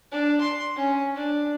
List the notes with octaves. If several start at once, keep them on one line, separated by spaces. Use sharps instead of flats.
D4
C6
C#4
D4